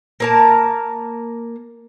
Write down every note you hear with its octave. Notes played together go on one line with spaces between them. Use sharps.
A#3 A#4 A5